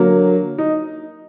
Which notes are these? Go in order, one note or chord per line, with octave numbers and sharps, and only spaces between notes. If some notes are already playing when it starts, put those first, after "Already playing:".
Already playing: D3 F#3 A#3
D#4